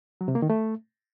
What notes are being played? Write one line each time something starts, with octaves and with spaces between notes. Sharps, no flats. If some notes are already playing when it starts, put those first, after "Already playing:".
F#3
C3
A#3
D#3
A3